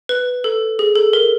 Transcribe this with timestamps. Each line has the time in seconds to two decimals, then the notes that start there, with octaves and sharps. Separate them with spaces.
0.09 B4
0.44 A4
0.79 G#4
0.95 A4
1.13 A#4